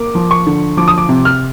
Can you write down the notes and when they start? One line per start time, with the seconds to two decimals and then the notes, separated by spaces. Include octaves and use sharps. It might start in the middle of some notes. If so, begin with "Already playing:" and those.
Already playing: A#3 D6
0.15 F3
0.31 C#6
0.46 D3
0.77 F3 D6
0.88 D#6
0.98 D6
1.09 C3
1.25 F6